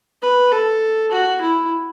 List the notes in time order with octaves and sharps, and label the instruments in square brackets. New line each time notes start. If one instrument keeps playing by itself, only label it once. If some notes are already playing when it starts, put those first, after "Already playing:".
[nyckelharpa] B4
A4
F#4
E4